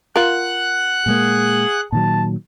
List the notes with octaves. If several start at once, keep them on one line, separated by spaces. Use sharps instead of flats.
F4 A#4 F#5 F#6
A#2 G#3 A#3 G#4
A#2 D#3 F#3 A5